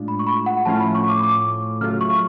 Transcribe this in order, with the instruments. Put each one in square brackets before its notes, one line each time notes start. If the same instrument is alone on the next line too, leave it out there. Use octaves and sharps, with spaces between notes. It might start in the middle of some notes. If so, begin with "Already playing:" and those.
Already playing: [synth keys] A2 G#3 D4 F4
[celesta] B5
C#6
B5
F#5
[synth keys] A2 F3 A3 C#4 F4 [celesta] A5
[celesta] B5
C#6
D6
D6
[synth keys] C#3 F#3 A3 F4 [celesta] F6
[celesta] C#6